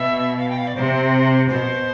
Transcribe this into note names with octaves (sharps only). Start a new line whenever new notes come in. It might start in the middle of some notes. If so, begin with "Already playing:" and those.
Already playing: B2 E5
F5
G5
F5
D5
C3 C5
B2 C5